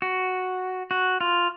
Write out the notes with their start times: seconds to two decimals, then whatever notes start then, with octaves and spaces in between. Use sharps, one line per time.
0.02 F#4
0.91 F#4
1.21 F4